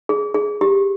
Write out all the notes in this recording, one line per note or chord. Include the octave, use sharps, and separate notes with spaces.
G#4
G#4
G4